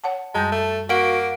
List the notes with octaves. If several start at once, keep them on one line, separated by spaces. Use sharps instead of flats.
C#5 F#5 A5
F#2 G3 G#3 A5 G6
A3
A#3 F#4 F5 F#5 D7